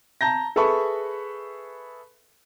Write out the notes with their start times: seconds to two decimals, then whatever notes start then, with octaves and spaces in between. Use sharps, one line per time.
0.21 A5 A#5 G6 A#6
0.56 G#4 A4 B4 E5 B5 C#6